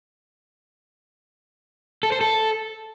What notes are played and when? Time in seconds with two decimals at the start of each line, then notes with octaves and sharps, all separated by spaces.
2.03 A4
2.12 C5
2.21 A4